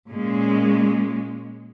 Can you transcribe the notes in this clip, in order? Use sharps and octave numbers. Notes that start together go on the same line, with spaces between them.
A#2 G#3 A#3 C#4